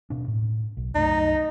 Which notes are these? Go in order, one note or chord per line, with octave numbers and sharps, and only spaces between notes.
D#1 B2 D4
A2
B1
C2 F#2 A3 D#4